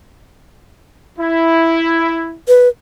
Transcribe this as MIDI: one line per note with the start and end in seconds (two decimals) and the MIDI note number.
1.18 2.35 64
2.48 2.68 71